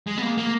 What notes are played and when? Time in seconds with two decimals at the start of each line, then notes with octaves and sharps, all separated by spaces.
0.07 G#3
0.18 B3
0.22 A#3
0.37 A#3